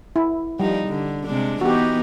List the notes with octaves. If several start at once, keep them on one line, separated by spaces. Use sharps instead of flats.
E4
F3 G3 D#4
D3
C3 G#3 D4
E3 B3 D#4 F#4 G4